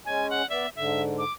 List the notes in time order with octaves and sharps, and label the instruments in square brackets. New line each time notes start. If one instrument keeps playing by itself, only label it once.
[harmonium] G#3 C#4 [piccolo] G#5
[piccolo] F#5
[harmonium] B3 D5 [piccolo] E5
[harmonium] G#2 D3 [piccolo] E5
[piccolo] D6